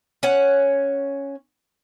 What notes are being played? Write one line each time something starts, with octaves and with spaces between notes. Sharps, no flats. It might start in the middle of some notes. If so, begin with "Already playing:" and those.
C#4 C#5 F#5